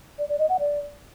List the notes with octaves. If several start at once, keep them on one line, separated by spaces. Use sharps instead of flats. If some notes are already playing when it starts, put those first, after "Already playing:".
D5
D5
D#5
F#5
D5